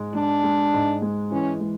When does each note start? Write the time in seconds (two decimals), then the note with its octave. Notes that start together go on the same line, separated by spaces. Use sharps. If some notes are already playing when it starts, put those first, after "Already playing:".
Already playing: G#2 G#3
0.14 G#3 D4
0.43 G#3
0.74 G#2
1.02 G#3
1.31 E3 C#4
1.60 G#3